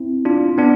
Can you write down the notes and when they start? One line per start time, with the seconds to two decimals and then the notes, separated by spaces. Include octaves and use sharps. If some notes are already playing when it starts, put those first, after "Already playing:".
Already playing: C4 E4
0.25 D4 F4
0.58 B3 D4